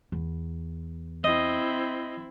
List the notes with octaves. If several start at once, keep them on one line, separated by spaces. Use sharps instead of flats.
E2
C4 E4 D#5